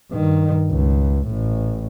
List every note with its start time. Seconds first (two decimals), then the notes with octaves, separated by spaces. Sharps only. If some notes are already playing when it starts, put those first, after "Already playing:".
0.11 G2 D#3
0.71 C#2
1.28 A1 A2